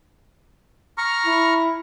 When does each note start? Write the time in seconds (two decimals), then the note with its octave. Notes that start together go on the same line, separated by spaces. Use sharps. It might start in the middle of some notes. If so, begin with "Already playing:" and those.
0.98 A#5 C#6 F6
1.26 E4